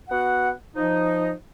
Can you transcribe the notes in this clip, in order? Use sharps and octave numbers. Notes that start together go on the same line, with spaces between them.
B3 F#4 F#5
F3 D#4